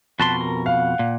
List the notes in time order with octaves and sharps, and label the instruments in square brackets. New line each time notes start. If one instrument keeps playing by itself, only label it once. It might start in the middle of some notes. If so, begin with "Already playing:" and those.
[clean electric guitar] F2 B2 C6 [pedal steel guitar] F#4 A5 B5
[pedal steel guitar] A#4
[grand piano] F5 [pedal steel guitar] F#5
[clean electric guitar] A#2